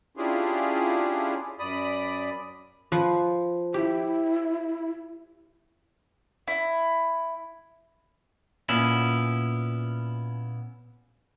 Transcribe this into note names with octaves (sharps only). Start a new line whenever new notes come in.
C#4 D4 E4 F4 G4 G#4
F#2 D5 B5 D#6
F3 B4
E4 G4
E4
A#2 B3 C#4 E4